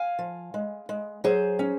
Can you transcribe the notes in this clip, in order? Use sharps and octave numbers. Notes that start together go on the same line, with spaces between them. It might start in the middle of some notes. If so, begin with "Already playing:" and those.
Already playing: F5 G#5
F3
G#3
G#3
F#3 G#4 C5
C#4